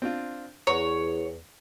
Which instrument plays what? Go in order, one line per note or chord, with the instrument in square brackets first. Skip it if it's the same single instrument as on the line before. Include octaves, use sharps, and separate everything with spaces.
[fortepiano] C4 D4 F4
[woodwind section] E2 [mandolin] C#5 [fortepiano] F#5 A#5